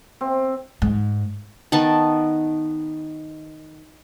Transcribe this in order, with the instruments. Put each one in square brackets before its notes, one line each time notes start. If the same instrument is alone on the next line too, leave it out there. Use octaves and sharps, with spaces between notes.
[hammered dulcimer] C4
[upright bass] G#2
[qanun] D#3 B3 A5